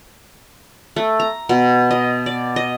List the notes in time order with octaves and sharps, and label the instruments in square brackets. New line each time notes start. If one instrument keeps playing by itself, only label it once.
[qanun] A3
A#5
B2
D#5
D5
D#5